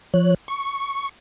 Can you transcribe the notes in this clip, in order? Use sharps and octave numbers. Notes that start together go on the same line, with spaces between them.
F3 C#5 F#6
C#6